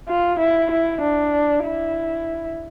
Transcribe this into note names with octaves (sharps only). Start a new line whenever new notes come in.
F4
E4
E4
D4
E4